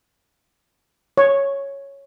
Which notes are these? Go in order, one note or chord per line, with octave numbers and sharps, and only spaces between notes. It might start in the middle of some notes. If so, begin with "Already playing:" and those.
C#5